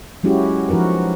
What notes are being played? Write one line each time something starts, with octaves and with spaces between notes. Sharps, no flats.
F#3 G#3 C#4 E4 F#4 G4
F3 D#4 F#4 A#4 B4